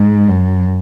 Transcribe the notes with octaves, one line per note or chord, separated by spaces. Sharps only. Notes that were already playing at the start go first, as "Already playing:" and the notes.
Already playing: G#2
F#2